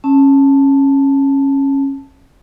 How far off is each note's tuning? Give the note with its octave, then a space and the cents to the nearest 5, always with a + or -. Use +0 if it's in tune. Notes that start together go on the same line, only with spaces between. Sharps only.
C#4 -15 A5 +0